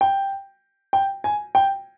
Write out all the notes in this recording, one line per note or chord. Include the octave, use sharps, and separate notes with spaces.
G5
G5
G#5
G5